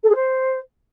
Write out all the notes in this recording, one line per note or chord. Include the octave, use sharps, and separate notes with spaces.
A4
G#4
C5